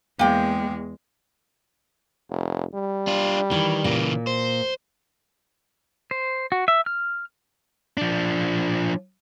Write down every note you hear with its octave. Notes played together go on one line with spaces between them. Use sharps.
E2 G#3 A#3 G5
F1
G3
D4 F4
D#3 E3
A#2 C#3 E3
C5
C5
F#4
E5
F6
F3 D4